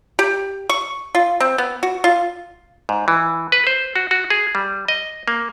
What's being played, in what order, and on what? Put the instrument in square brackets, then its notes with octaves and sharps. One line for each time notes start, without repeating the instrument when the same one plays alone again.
[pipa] G4
C#6
F4
C4
B3
F#4
F4
[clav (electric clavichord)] G#2
E3
B4
C5
F#4
F#4
G#4
G3
D#5
A#3